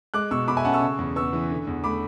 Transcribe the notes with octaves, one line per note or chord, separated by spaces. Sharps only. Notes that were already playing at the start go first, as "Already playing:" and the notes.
G#3 D6 F#6
B2 C#6 E6
B2 B5 D6
E5 G#5
C#4 F#5 A5
C#6 E6
C#3
E2
B3 C#6 E6
E3
D3
E2
A3 B5 D6